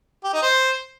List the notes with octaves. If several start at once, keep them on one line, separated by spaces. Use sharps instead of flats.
G4
D#4
C5